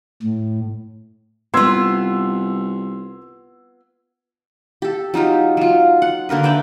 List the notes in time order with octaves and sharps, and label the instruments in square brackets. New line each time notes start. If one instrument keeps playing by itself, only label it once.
[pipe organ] A2
[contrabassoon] C2 [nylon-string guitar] B3 F4 [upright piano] C6 E6 G#6
[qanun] G4 A4
F#3 D#4 F4 G4
F#3 F4
F#5
D3 A#3 A#4 B4
B4 D5 E5 G5